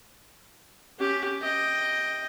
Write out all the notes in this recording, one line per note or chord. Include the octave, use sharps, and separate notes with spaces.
C#4 G4
D#5 G5